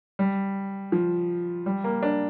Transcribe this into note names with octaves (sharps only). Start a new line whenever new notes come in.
G3
F3
G3
A#3
D4